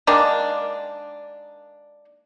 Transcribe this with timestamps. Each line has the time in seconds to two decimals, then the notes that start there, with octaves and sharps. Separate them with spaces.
0.07 D#3 G#3 A#3 D4